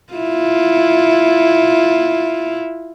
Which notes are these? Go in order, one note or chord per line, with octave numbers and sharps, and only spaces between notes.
E4 F4